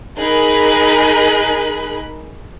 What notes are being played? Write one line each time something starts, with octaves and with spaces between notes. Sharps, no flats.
D#4 G#4 A#4 B5 F#6